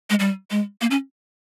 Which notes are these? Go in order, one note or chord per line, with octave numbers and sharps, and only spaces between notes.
G#3
G3
G#3
A#3
C#4